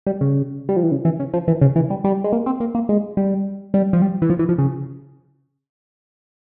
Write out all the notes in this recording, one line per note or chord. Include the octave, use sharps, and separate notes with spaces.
G3
C#3
G3
F3
E3
C#3
E3
C#3
F3
E3
C#3
E3
G3
G3
G#3
A#3
C4
A#3
A#3
G#3
G3
G3
F3
G3
E3
F3
E3
F3
C#3